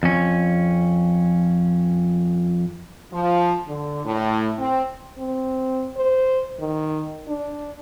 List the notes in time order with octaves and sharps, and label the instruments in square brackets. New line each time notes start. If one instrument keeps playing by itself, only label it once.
[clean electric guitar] F2 C#4
[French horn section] F3
D3
A2
C4
[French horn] C4
C5
D#3
D4